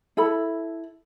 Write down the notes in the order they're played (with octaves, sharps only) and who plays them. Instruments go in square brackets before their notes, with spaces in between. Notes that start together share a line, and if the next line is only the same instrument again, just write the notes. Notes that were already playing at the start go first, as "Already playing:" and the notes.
[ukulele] E4 A4 B5